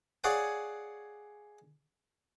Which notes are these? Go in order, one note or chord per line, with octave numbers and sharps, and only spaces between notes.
G#4 C#5 D5 F5 F#5 G#5